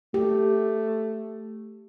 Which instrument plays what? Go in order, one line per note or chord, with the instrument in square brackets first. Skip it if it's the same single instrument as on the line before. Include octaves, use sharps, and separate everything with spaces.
[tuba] A3 [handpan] G4